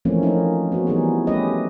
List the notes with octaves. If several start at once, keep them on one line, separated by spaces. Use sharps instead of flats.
E3 F3 A3 A#3 C4 C#4
F3 A#3 C#4 D#4
B3 F#4
E3 G3 B3 D#4 G#4
G3 A3 C#4 G4 B4 D#5